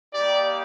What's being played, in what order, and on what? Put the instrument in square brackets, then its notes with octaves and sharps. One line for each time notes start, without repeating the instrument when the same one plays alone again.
[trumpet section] G3 A#3 D#4 G4 D5